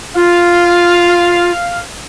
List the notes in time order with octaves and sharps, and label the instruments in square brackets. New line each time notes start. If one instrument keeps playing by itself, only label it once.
[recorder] F4 [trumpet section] F5